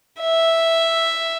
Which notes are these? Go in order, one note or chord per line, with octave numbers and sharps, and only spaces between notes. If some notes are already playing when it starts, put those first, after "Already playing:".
E5